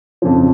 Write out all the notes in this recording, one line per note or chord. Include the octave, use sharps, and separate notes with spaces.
F2 C#3 F3